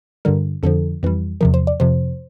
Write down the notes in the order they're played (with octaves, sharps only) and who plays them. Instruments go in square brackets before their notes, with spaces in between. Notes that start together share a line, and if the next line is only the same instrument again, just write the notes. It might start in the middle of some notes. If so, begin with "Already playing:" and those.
[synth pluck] G2 D3 G3 A#4
F2 D3 F3 A4
F2 E3 G3
E2 C3 F3 A#4
C5
D5
F2 C3 F3 C5